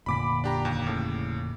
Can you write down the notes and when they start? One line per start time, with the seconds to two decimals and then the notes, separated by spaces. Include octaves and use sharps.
0.06 F1 A#2 D3 B5 D6 B6
0.44 D4 G4 A#5
0.65 D#2
0.86 A2 C#3